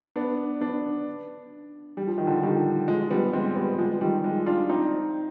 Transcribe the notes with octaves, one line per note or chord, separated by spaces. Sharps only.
B3 D4
B3 D4
G3
F3
D#3
D3 F3
D#3 G3
F3 G#3
G3 B3
G#3 C4
G3 B3
F3 G#3
D#3 G3
F3 G#3
D4 F4
C4 D#4